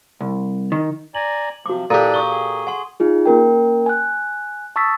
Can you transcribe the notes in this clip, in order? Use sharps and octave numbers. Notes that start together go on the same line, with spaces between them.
C2
D#3
D5 G#5 A#5 F#7
C3 F3 F#4 D6
A#2 E3 D4 G4 A4 D5 D#7
C#6 D#6 G7
G#4
F#5 G#5 C6
D#4 F4 G#4
A#3 C#4 A#4 G5
G#5 F#6
A5 C#6 D#6 E6 A6 B6